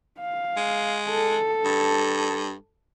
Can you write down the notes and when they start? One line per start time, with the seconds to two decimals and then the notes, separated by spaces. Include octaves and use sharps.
0.20 F5
0.57 G#3
1.10 A4
1.65 G2